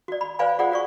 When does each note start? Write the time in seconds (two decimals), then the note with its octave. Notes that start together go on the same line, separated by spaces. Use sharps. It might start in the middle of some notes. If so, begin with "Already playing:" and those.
0.08 F#4 D5
0.21 B5
0.39 B4 C5 D5 F5 G#5 B5
0.59 F4 G#4 C5 D5 F#5
0.72 F#4 D5 C#6